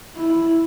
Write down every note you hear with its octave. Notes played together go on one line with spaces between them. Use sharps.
E4